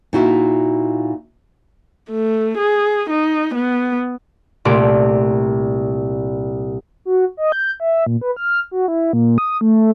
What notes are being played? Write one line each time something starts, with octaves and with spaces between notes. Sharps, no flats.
A#2 D#4 E4 F#4 E5
A3
G#4
D#4
B3
C2 A#2 A3 D6
F#4
D#5
G6
E5
A#2
B4
F6
F#4
E4
A#2
D#6
A3